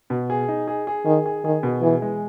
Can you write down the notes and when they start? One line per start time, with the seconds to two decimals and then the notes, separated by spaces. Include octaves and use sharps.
0.10 B2
0.30 G#4
0.48 D#4
0.67 G#4
0.87 G#4
1.06 D#3 G#4
1.26 G#4
1.44 D#3 G#4
1.63 B2
1.82 E3 G#4
2.02 G#3